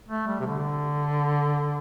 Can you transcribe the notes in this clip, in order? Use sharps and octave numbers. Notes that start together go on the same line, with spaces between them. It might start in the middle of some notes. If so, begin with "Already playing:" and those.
A3
G3
C3
D3